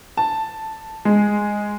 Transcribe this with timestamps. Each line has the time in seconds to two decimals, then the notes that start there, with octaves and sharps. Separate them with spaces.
0.17 A5
1.05 G#3